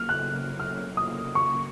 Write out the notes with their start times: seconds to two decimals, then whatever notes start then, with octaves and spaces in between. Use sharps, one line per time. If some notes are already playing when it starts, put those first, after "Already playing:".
Already playing: C#3 F#3 A#3 F6
0.09 F#6
0.60 F6
0.97 D#6
1.35 C#6